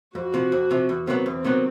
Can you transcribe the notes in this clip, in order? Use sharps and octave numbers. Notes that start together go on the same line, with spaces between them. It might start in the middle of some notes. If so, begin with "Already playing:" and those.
F2 F#4
C3 F3
F2
C3 F3
E2
C3 D#3 F#3 B3
E2 C4
C3 D#3 F#3 B3